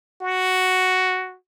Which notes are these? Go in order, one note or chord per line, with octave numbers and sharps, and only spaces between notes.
F#4